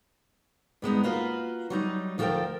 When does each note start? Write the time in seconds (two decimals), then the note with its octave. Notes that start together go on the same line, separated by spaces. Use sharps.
0.82 G2 G#3 B3 D#4
1.03 A#3 F4 F#4 B4
1.70 F#3 G3 D#4
2.18 D2 F3 F#4 A4 A#4 G5